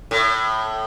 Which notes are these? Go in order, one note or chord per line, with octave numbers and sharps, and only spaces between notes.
A2